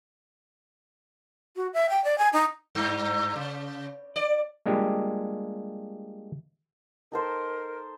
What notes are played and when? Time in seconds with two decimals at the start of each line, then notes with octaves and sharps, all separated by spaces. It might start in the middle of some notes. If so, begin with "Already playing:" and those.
1.56 F#4
1.74 E5
1.89 G5
2.04 D5
2.18 G#5
2.33 D#4
2.75 G2
3.36 C#3
4.16 D5
4.66 G3 G#3 A#3 D4 F4 G4
7.12 D#4 A4 A#4 C5